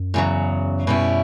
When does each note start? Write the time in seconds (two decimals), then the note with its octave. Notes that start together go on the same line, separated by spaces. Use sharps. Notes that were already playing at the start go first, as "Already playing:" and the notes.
Already playing: F#2
0.14 E2 C#3 F#3
0.87 B2 G3 C#4 E4